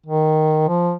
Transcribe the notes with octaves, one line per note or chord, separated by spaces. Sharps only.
D#3
F3